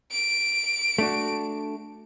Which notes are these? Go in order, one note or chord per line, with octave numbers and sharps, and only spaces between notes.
D7
A3 D4 F#4